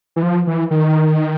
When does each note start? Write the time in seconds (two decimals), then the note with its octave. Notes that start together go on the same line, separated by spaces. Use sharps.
0.16 E3
0.23 F3
0.47 E3
0.71 D#3